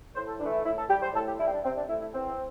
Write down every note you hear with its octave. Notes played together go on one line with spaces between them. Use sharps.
A2 C5
A4
E3 A3 D4
E4
A2 E4
A4
G3 G4
C5
A2 A4
G4
G3 E4
C4
D4
C3 C4
D4
A3 E4
E4
E2 C4